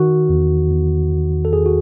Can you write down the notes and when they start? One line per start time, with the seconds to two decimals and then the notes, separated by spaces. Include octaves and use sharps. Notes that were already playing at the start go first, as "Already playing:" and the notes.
Already playing: D#3 F#4
0.29 E2
0.71 E2
1.12 E2
1.45 A4
1.53 E2 G#4
1.66 F#4